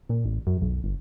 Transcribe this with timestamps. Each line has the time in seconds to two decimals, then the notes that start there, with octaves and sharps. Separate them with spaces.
0.09 A#2
0.25 A1
0.47 F#2
0.61 B1
0.84 G1